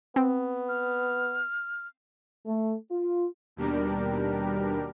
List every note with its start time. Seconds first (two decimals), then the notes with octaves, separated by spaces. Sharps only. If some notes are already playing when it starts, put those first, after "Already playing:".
0.16 B3 C4
0.69 F6
2.46 A3
2.91 F4
3.56 D#2 B2 G3 D4 G4 A#4